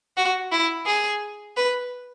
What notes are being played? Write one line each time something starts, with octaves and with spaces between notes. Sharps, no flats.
F#4
E4
G#4
B4